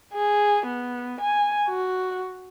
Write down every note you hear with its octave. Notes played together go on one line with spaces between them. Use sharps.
G#4
B3
G#5
F#4